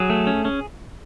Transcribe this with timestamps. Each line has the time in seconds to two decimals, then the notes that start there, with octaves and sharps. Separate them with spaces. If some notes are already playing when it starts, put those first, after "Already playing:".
Already playing: F#3 G#4
0.10 A3
0.27 C#4
0.45 C#4